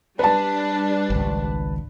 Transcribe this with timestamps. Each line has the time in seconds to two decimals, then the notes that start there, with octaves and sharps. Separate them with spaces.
0.19 G3 D4 B4 A5
1.10 G#1 C#2